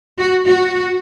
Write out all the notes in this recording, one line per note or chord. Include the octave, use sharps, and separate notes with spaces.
F#4
F#4